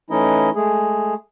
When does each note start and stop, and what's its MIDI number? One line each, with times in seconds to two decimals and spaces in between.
0.10 0.50 52
0.10 0.50 57
0.10 0.50 61
0.10 0.50 63
0.10 0.50 64
0.10 0.50 75
0.55 1.14 56
0.55 1.14 57
0.55 1.14 68